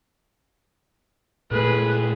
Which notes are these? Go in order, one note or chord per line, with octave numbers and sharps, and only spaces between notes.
A#2 A3 G#4 B4